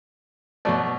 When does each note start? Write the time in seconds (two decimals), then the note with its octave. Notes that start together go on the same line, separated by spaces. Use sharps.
0.65 B2 F#3 A3 D5